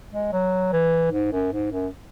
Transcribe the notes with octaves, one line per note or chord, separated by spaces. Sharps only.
G#3
F#3
E3
G#2
F#2
G#2
F#2